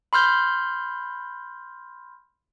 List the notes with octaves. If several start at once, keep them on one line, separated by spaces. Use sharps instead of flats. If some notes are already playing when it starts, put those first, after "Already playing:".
B5 C6 F6 G6